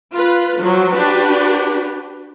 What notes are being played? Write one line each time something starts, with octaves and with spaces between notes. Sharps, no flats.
F4 B4
F3 F#3
D4 F#4 G4 B4